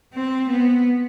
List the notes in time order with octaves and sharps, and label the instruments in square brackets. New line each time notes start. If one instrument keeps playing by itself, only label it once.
[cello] C4
B3